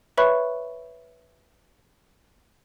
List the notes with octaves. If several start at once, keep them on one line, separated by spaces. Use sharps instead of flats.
B4 C#5 E5 B5 C#6 F#6